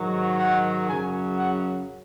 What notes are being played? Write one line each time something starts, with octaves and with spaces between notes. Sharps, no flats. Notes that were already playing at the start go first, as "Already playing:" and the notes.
Already playing: G#2 D#3 F#3
F#5
F#2 C#3 F#3 G#5
F#5